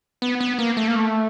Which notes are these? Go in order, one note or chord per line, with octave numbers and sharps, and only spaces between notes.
B3
B3
A#3
A3
A#3
A3